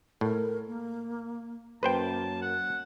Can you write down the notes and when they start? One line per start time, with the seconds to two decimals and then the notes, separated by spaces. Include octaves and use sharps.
0.21 A2 A#4
0.68 A#3
1.83 F#2 A#3 B4 C5 G5 A5
2.42 F#5